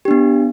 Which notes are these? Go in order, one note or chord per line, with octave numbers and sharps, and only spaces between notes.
B3 D4 G4